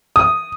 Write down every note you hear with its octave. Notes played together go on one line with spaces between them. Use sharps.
D#6